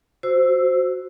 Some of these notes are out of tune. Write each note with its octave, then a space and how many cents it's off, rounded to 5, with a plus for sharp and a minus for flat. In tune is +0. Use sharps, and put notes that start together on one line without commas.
F#4 +0 C5 -5 E6 +10